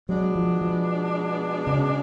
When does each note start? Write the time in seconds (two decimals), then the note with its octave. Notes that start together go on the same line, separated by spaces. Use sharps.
0.09 B2 F#3 G#3 B3 D4
0.36 F3
0.61 F3
1.67 C#3